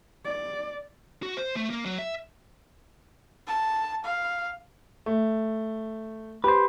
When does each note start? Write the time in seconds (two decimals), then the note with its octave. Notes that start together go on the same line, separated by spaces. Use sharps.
0.25 D5
1.23 F#4
1.37 C5
1.56 A3
1.70 A#3
1.85 F#3
1.98 E5
3.47 A5
4.05 F5
5.06 A3
6.44 G4 B4 C5